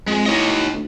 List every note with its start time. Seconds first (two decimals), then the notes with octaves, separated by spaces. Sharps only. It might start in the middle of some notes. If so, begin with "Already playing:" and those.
0.07 F2 G#3
0.26 A2 D#4 C#5 D#5
0.73 D2